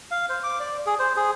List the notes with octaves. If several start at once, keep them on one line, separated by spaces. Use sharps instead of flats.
F5
C5
D6
D5
G#4
C5
G#4